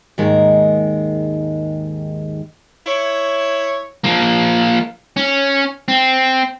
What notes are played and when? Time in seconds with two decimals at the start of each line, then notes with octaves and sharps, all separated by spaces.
0.18 D#2 G#2 D#3 G#3 A#4
2.86 E4 C#5
4.04 F3 A#3
5.17 C#4
5.88 C4